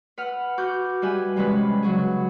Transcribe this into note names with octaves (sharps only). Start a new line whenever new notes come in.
B4 F#5 F6
F#4 D6 F6 G6
G3 G4 B4 E5 G#5 B5
C3 E3 G3 G#3 C#4 B4
C#3 F#3 G#4